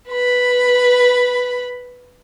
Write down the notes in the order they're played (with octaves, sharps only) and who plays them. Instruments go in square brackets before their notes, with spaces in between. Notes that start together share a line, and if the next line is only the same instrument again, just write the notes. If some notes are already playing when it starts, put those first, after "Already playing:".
[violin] B4 B5